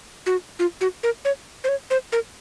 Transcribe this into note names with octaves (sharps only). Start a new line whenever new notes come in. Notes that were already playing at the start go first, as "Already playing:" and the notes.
F#4
F4
F#4
A#4
C#5
C5
C#5
C5
A#4